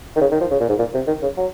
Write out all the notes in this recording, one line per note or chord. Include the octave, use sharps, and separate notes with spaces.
D#3
C#3
D#3
F3
C#3
A#2
G#2
A#2
C3
D#3
C#3
F#3